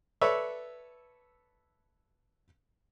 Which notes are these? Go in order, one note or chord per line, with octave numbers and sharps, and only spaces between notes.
A4 B4 C#5 D5 E5